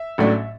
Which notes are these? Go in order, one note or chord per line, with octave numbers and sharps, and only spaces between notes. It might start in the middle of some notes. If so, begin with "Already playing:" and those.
Already playing: E5
A1 A2 F#3 A3 D4